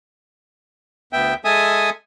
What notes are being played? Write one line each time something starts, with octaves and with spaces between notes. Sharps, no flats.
D2 B3 E5 G5
G#3 A4 E5 G#5 D#6